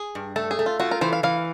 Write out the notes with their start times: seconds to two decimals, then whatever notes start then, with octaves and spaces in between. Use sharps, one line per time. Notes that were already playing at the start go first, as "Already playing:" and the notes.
Already playing: G#4
0.15 G2
0.36 A3 A4
0.51 G#4
0.59 A3
0.66 F4
0.79 F4 F#4
0.91 A#4
1.01 E3 C5
1.13 F5
1.23 E3 F5